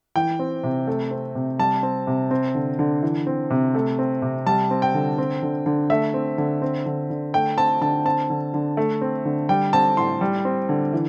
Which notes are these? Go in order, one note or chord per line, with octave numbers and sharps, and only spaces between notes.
E3 G5
C4
C3
A3
C4
C3
G3 A5
C4
C3
C4
D3
D3
E3
C4
C3
A3
C4
C3
G3 A5
C4
G5
D3
C4
D3
D3
A3 E5
C4
D3
C4
D3
D3
A3 G5
C4 A5
D3 A5
C4 A5
D3
D3
A3
C4
D3
G3 G5
C4 A5
A2 C6
G3
C4
D3
E3